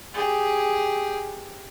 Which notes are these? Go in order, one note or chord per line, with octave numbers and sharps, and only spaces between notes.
G4 G#4